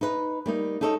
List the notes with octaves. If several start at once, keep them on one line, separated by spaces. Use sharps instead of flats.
D#4 B4
G3 A#3 D#4
D#4 G4 A4 C#5 D#5